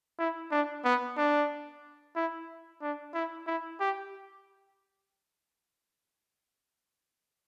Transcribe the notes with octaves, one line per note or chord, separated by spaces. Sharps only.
E4
D4
B3
D4
E4
D4
E4
E4
G4